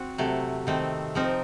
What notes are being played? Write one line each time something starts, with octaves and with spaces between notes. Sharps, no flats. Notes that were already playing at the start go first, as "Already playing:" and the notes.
Already playing: C4 F#4
C3 F#3 A3
D#3 A3 C4
F3 C4 D#4 A#4